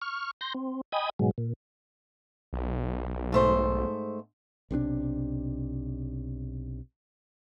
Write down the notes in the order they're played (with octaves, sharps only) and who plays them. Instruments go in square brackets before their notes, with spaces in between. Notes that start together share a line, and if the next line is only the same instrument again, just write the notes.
[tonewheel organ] C#6 F6
C6 G6 A#6
C4
D#5 G5 G#5 B5 D#6
G#2 B2 F#3 G#3
A#2
[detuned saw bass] B1
[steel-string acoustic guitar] G#2 A3 C5
[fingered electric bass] B1 C3 F#3 D4